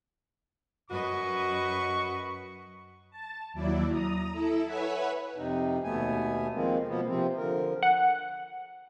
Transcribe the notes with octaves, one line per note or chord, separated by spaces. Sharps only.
F#2 F#4 B4 D#5 C#6
A5
D#2 F#3 E4 D5
A#5 D#6
E4 A4 E5
B4 C#5 E5 F#5 G#5 B5
F2 C3 D#4
D#2 B2 A3 B3 G#5
D#3 F3 G#3 A#3 C4
B2 F3 A#3 B3
C3 F3 C4
D3 F3 A#4
F#5